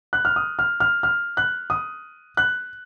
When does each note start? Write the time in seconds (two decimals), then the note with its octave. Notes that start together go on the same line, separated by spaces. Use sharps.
0.13 F#6
0.25 F6
0.36 D#6
0.59 F6
0.80 F6
1.03 F6
1.37 F#6
1.70 D#6
2.37 F#6